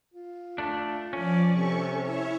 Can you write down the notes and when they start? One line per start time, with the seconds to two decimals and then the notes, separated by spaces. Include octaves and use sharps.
0.14 F4
0.58 A3 D4
1.13 F3 C#4 D5
1.52 C3 A4 C#6
2.00 E4 C#5 E5